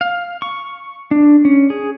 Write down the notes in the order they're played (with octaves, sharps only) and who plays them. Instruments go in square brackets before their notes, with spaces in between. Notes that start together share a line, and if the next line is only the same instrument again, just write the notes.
[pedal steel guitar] F5
C#6
D4
C#4
G#4